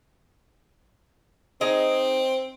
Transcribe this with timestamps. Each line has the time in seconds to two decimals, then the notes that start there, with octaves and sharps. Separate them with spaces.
1.61 C4 D#4 G#4 D#5